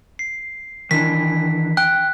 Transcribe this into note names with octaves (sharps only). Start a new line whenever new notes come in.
C7
D#3 E3 D4 B6
G5 F#6